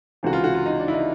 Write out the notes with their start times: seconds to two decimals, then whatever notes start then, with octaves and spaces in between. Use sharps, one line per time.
0.23 C#2 C3 E3 F#4
0.33 F4
0.44 F#4
0.55 F4
0.66 D#4
0.79 D4
0.88 E4
0.94 D#4